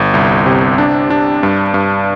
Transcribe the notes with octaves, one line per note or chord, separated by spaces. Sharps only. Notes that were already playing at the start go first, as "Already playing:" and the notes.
Already playing: G1
C2
C3
D4
D4
G2
G2